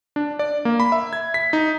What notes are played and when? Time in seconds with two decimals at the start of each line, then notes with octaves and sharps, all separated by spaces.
0.16 D4
0.39 D5
0.65 A#3
0.80 B5
0.92 E5
1.13 G#6
1.34 B6
1.53 D#4